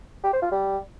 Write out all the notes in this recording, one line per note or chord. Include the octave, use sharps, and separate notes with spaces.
G4
C5
F4
G3